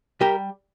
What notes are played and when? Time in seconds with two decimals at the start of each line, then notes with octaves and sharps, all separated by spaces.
0.21 G3 G4 A#4